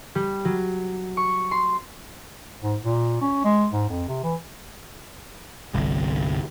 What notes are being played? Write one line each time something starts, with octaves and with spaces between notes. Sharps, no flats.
G3
F#3
C#6
C6
G#2
A#2
C#4
G#3
G#2
F2
C3
E3
G1 C2